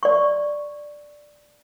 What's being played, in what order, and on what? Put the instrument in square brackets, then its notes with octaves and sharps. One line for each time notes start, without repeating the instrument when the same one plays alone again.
[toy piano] D5 C#6